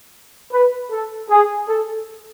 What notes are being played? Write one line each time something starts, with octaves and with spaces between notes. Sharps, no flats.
B4
A4
G#4
A4